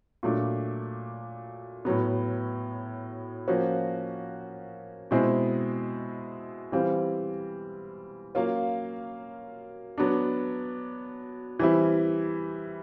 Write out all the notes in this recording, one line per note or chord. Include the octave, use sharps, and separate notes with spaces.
A#2 F#3 A3 D4
A2 F#3 B3
F3 A#3 C#4 F#4
B2 G#3 C4 E4
E3 G3 C4 F4
F#3 A#3 C#4 F4
F#3 B3 D4
E3 G3 C4 E4